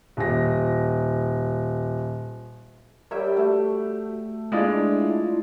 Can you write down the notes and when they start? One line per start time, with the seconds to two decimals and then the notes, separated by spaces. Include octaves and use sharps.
0.17 D#1 A#6
3.11 G3 A#4 C#5 E5 G5
3.37 A3 F#4
4.52 G#3 D4 E4 F4 D5